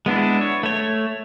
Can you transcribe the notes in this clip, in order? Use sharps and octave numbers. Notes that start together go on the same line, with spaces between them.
G#3 B3 D4 E4
C#5
A3 C#5